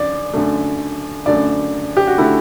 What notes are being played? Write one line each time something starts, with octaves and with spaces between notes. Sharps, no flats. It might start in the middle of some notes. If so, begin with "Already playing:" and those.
Already playing: F#2 D3 D5
F#2 D3 A3
F#2 D3 A3 D5
G4
F#4
D3 A3 E4